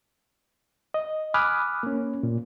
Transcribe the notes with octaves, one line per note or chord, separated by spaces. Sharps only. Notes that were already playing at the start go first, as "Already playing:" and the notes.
D#5
G#5 B5 D6 D#6 F6 F#6
A#3 C#4
A#2